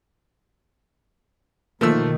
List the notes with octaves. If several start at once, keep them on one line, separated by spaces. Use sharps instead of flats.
B2 D#3 F3 A3 A#3 E6